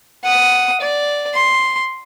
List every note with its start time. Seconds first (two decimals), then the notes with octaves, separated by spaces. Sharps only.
0.24 F#5 D#6
0.80 D5
1.34 C6